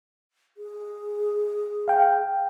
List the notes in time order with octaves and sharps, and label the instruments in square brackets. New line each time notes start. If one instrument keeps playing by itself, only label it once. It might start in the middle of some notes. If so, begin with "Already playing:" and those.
[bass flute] G#4
[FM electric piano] F5 G5